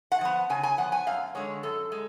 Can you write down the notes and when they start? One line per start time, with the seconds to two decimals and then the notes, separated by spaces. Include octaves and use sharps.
0.12 F#5
0.21 F3 B3
0.50 C#3 G#5
0.63 G#5
0.78 F3 B3 F#5
0.92 G#5
1.07 F#2 F5
1.35 D3 G#3 C#5
1.63 F#2 A4
1.92 G#3